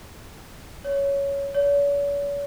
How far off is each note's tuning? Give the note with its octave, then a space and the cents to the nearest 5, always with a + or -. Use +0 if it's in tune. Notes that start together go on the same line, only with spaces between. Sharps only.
C#5 +10
C#5 +45